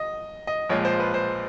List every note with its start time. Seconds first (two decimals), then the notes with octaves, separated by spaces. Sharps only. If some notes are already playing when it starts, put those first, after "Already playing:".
Already playing: D#5
0.47 D#5
0.69 A#1 A#2 F3 G#3 C#5
0.85 C5
0.99 B4
1.14 C5